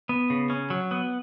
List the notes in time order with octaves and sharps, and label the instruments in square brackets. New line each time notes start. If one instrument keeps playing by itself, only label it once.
[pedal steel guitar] B3
C#3
C#4
F#3
B3